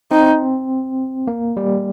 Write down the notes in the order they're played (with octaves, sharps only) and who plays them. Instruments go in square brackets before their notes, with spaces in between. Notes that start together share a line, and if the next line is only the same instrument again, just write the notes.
[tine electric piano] C4 [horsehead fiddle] D#4
[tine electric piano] A#3
G3